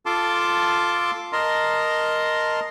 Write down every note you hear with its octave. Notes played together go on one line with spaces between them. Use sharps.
F4 A4 A5 C6 D6
A#4 D#5 A5 A#5 C6